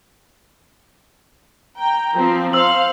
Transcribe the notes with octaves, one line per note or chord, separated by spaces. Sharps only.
G5 A#5
F3 C4
C5 F5 E6 F#7